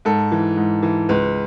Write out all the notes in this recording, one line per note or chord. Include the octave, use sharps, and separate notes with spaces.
G#2 A4
E3
G#2
E3
C#2 B4